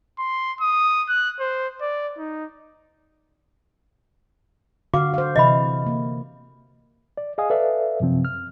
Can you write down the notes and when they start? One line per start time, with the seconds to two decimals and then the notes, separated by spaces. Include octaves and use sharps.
0.19 C6
0.61 D#6
1.09 F#6
1.40 C5
1.81 D5
2.18 D#4
4.94 D3 F#4 F5 D6
5.14 C5 F5
5.36 C3 E3 D#5 E5 B5
5.86 A#3
7.17 D5
7.38 G#4 D#5 F5 G#5 D#6
7.50 A4 B4 D5 E5 F5
8.00 F#2 C3 F3 C4
8.25 F6